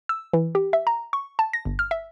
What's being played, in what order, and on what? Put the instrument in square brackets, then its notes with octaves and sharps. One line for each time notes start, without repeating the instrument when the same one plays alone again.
[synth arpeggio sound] E6
E3
G4
E5
A#5
C#6
A5
A#6
G1
F6
E5